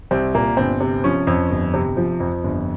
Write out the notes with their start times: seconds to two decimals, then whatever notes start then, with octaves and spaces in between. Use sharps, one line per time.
0.11 C2 C4
0.35 A#2 A#3
0.57 G1 C4
0.80 C3
1.04 F3 C#4
1.27 F2
1.50 G1
1.74 C3
1.97 F3
2.20 F2
2.44 G1